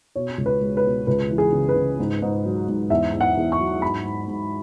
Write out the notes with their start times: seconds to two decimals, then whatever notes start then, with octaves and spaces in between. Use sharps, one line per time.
0.16 B2 C#5
0.38 C#2
0.46 B4
0.61 G#3
0.77 B4
0.84 B2
1.07 C#2 B4
1.31 E3
1.38 G#4
1.52 C#3
1.69 B4
1.76 C#3
1.99 G#2
2.22 G#2
2.45 F#3
2.68 G#2
2.90 E2 E5
3.13 E2
3.21 F#5
3.37 E2
3.52 C#6
3.59 F#3
3.82 G#2 B5
4.05 G#2
4.28 G#2